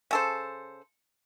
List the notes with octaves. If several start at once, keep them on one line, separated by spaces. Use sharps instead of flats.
C#3 A4 C5